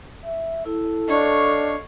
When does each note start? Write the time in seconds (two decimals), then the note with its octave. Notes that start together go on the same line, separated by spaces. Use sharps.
0.25 E5
0.66 E4 A4
1.08 D4 C#5 D#5 F5 C#6